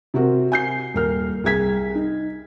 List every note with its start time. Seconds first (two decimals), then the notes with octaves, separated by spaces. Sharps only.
0.14 C3 C4 F#4 A#4
0.52 G#5 G6 C7
0.94 D#1 A#4 F6
1.44 C2 G#4 G#6 B6
1.95 D#4